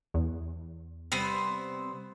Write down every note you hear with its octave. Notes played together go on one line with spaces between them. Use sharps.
E2
C3 G3 B3 C4 C5